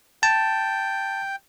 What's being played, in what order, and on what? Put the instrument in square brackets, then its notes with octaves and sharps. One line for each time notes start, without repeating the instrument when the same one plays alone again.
[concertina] G5 [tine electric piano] A5